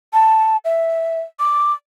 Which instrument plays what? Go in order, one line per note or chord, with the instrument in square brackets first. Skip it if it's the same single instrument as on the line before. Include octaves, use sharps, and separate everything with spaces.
[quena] A5
E5
D6